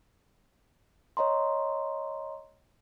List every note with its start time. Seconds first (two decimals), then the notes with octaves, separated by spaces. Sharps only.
1.17 C#5 D#5 A#5 C6